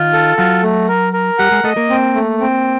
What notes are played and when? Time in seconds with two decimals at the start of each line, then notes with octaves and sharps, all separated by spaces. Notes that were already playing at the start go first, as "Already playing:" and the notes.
Already playing: D#3 D#4 F4
0.13 A4
0.37 F#3 F4 F#4
0.63 A3
0.88 A#4
1.13 A#4
1.39 G3 G4 F#5
1.52 G#3 G#4
1.64 A3 A4 D#5
1.77 A#3 A#4
1.89 C4
2.15 A3
2.40 C4